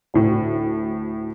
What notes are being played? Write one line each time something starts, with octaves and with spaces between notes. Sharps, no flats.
D2 A2